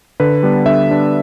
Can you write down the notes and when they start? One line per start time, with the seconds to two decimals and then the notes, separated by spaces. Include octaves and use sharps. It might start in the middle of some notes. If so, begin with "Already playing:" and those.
0.20 D3 B4
0.43 G3 B3 D4
0.66 D3 E5
0.89 G3 B3 D4